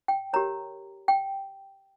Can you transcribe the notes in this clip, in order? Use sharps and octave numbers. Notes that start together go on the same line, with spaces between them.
G5
G4 A#4 C#5 A#5
G5